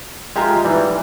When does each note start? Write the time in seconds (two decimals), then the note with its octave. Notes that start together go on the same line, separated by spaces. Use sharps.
0.36 G#3 F4 G4 E5 A#5
0.64 E3 G3 D#4